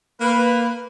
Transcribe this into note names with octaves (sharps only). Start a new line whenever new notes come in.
A#3 B4